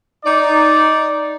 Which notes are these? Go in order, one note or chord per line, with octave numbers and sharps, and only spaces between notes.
D#4 D5